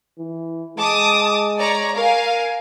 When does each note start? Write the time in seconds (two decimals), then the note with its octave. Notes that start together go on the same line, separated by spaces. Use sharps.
0.18 E3
0.78 G#3 A5 D6 D#6
1.59 C#5 D5 A#5
1.95 A#4 F5 G#5